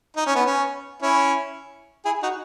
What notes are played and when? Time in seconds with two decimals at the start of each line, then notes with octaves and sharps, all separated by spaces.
0.16 D#4
0.27 C#4
0.35 B3
0.46 C#4
1.02 C#4 E4
2.05 E4 G#4
2.23 D#4 F#4